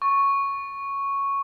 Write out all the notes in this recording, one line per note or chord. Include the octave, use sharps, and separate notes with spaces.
C#6